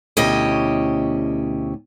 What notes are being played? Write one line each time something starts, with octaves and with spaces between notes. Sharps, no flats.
D2 B2 C#4 E4 G4 D#5